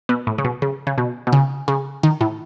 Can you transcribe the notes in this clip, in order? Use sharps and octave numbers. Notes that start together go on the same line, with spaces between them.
B2
A2
C#3
B2
C#3
C#3
B2
B2
C#3
C#3
D#3
A2